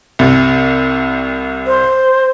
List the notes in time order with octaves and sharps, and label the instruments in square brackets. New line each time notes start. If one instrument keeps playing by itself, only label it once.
[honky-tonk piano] C2 C3
[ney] C5